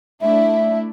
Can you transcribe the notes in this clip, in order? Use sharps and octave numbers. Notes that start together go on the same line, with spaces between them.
A3 D4 E4 E5